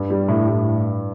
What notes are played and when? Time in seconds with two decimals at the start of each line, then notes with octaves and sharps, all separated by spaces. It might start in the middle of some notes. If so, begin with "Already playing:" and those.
Already playing: G2
0.10 G3
0.28 A2
0.48 A2